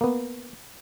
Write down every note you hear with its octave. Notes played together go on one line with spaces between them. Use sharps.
A#3 B3